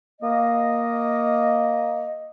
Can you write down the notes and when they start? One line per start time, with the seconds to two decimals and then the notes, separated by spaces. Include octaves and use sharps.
0.21 A#3 D#5